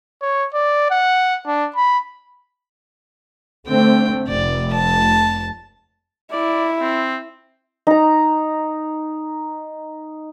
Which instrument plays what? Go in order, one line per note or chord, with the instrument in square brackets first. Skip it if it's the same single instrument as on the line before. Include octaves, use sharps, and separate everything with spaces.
[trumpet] C#5
D5
F#5
D4
B5
[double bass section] D3 A3 C4 [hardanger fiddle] G5
[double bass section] F1 [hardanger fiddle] D5
[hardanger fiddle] A5
[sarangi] E4 [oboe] D5
[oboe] C4
[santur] D#4 A#5